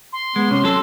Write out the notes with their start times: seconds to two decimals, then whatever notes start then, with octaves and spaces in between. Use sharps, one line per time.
0.13 C6
0.36 G#3 B3
0.51 C3 C#4
0.64 F#3 A4